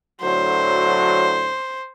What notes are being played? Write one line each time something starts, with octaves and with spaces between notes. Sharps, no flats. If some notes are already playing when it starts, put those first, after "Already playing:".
A2 D3 F#3 C5